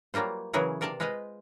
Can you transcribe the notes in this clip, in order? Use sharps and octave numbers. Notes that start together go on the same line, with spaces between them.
F#3 G3 A#3 F4 C5
C#3 E3 F#3 E4 G#4 A#4
C3 A#4 D5 F5 A5
G#3 F4 B4 C5 D#5 F5